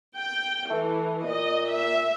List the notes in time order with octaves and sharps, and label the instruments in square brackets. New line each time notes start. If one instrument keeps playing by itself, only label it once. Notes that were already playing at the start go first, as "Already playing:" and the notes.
[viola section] G5
[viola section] E3 [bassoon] A3
[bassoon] A#2 [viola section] D#5
[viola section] E5